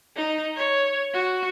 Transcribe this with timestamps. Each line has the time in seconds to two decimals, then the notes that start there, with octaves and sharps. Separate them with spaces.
0.17 D#4
0.56 C#5
1.13 F#4